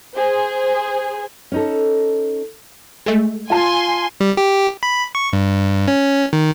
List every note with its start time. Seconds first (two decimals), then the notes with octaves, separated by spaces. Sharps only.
0.15 G#4 C5
1.52 C#4 D#4 A4
3.06 G#3 A3
3.50 F4 G#5 A5 C6
4.20 G3
4.37 G4
4.83 B5
5.15 C#6
5.33 G2
5.88 C#4
6.33 D#3